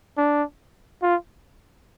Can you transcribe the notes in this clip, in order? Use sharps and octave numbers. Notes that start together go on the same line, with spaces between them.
D4
F4